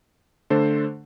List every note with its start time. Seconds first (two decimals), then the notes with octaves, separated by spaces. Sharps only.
0.50 D3 A3 D4 A4 C5